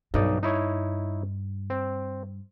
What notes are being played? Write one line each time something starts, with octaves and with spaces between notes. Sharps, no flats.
B1 G2 D#4 D5
D#4 E4 C#5
C4